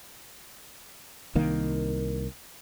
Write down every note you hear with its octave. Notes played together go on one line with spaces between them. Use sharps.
C2 D#3 A#3